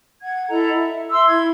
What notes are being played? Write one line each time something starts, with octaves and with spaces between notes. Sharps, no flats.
F#5 G#6
E4 A4 D#5 A#5
E5
E5 C6 E6
E4 G#6